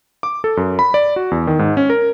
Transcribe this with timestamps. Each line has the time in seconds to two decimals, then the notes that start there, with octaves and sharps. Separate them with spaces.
0.23 D6
0.44 A4
0.57 F#2
0.79 B5
0.94 D5
1.16 F#4
1.31 E2
1.47 D#3
1.59 G#2
1.77 C#4
1.90 A#4